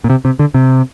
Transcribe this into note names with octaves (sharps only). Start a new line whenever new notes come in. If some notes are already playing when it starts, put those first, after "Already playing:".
A#2
C3
C3
D3
C3